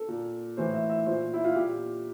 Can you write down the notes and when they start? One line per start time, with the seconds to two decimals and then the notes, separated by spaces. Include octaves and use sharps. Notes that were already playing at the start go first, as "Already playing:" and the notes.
Already playing: A4
0.08 A#2
0.57 A2 E3 C5
0.74 E5
0.89 E5
1.06 A#2 C5
1.33 E4
1.44 F4
1.56 A#2 G4